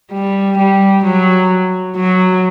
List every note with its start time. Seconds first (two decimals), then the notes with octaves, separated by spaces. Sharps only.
0.12 G3
0.58 G3
1.04 F#3
1.97 F#3